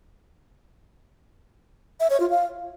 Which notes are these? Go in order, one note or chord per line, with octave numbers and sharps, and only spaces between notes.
E5
C#5
F4
F5